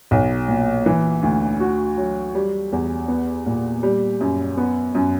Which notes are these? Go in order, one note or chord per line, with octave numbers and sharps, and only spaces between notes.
B1
A#2
E3
D2
F#4
F#3
G3
E2
B3
A#2
G3
F#2
B3
F#2